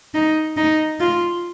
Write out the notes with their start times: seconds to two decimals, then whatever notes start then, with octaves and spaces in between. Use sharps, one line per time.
0.14 D#4
0.57 D#4
1.00 F4